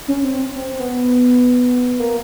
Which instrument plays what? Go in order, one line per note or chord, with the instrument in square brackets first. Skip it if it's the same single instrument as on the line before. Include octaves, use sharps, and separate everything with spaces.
[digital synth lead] C#4
C4
C4
C4
B3
A#3